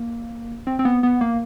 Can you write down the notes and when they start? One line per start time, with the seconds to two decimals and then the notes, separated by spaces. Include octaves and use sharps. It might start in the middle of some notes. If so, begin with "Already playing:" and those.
Already playing: A#3
0.67 C4
0.79 C4
0.85 B3
1.03 B3
1.21 A#3